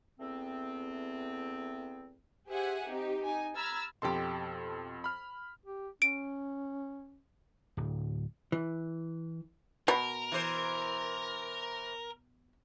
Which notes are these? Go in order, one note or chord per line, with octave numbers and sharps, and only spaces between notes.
E2 A3 B3 C4
G4 G#4 C5 E5 F#5 G#5
C4 D#4 G4
D#4 G#5
A#5 B5 E6 F6 G#6 A6
F2 B2 G4 A4 C6
B5 F6
G4
C#4 D7
D1
E3
B2 A#4
E3 C5